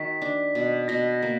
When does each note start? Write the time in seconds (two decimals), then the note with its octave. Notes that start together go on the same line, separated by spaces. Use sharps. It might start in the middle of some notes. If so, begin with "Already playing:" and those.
Already playing: D#3 F#4 B6
0.22 D4
0.55 B2
0.88 B2 A#6
1.23 A#3